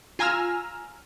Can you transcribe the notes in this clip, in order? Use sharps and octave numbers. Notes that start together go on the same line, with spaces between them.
F4 G#5 A#5 E6 F6